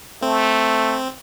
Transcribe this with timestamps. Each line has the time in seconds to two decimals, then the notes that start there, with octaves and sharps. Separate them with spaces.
0.22 A3 C4